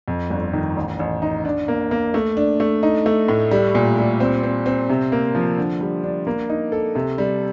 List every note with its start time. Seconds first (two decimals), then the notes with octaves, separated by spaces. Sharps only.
0.08 F2
0.30 G1
0.53 D#3
0.76 A1
0.99 A1
1.22 D#4
1.45 D4
1.68 A#3
1.91 A#3
2.14 A3
2.37 D4
2.60 A3
2.83 D#4
3.06 A3
3.28 A2
3.51 G3
3.75 A#2
3.97 G3
4.20 C4
4.43 C4
4.66 C4
4.89 C3
5.12 A#3
5.35 F3
5.58 D3
5.81 G3
6.04 D4
6.27 A#3
6.49 D#4
6.72 A4
6.95 C3
7.18 G3